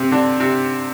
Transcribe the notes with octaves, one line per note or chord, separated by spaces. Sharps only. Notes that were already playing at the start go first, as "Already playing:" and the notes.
Already playing: C3 C4
D3 D4
C3 C4